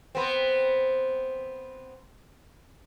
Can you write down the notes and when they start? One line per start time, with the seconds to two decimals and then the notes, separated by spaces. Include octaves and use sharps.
0.15 B3 C4